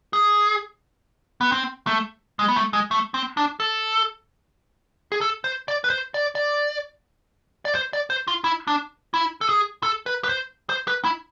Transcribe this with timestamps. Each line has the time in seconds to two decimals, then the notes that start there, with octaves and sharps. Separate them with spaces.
0.13 G#4
1.41 B3
1.52 C4
1.87 A3
2.39 G#3
2.48 B3
2.56 A3
2.73 G#3
2.91 A3
3.14 C4
3.37 D4
3.60 A4
5.12 G#4
5.21 A4
5.44 C5
5.68 D5
5.84 B4
5.90 C5
6.14 D5
6.35 D5
7.65 D5
7.75 C5
7.93 D5
8.10 C5
8.28 F4
8.44 E4
8.67 D4
9.14 E4
9.41 A4
9.49 G#4
9.83 A4
10.06 B4
10.24 B4
10.29 C5
10.69 C5
10.88 B4
11.04 E4